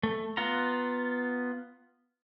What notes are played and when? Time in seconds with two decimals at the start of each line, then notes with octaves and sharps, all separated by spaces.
0.03 A3
0.37 B3 F4 F#5 A#5